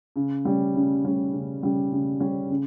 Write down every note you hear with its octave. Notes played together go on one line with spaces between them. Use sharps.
C#3
G3 C#4
C#3
G3 C#4
C#3
G3 C#4
C#3
G3 C#4
C#3